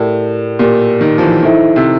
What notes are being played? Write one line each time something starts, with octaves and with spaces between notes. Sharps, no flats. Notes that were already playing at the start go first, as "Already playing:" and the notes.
Already playing: A2 G4 A#4 D5
A#2 G4 A#4 D5
D#3
F3
E3
D#3 E4 A4 C5 E5
C3